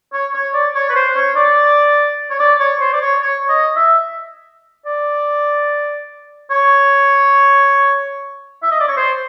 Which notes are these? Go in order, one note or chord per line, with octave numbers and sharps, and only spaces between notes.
C#5
C#5
D5
C#5
B4
C5
C#5
D5
C#5
D5
C#5
C5
D5
C#5
C#5
D#5
E5
D5
C#5
E5
D#5
D5
C#5
C5